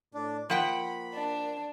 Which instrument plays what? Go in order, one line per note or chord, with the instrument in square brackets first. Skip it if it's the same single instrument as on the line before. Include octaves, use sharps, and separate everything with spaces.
[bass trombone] A2 [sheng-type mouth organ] D4
[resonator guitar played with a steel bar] F3 F#5 G5 [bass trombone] A#3 [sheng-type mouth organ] B5
[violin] D4